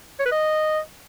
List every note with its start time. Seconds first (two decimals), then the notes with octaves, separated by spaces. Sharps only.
0.20 C#5
0.26 B4
0.32 D#5